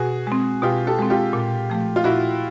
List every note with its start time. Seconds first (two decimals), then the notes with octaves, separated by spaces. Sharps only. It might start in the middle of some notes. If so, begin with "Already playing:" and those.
Already playing: B2 F#4 G#4
0.27 G#3 C4
0.62 B2 F4 G4
0.87 G4 A4
0.99 G#3 C4
1.10 F4 G4
1.33 A#2
1.70 F3 A3
1.96 F4
2.04 A#2 E4 F#4